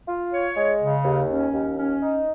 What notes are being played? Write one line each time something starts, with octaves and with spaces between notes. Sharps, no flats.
F4
C#5
G#3
C#3
D#2
C#4
D#2
C#4
D#4